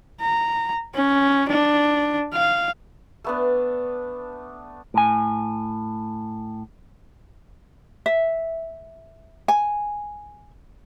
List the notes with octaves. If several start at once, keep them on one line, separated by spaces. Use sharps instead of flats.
A#5
C#4
D4
F5
A3 B3 D4
A2 G#5
E5
G#5